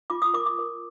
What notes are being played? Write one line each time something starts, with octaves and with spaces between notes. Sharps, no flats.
F4 D6
D#6
A#4 D6
D6
A#4